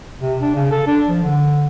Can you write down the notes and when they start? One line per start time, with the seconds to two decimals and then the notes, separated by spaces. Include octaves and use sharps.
0.21 C3
0.41 D4
0.56 C#3
0.71 A4
0.87 D4
1.09 F3
1.24 D3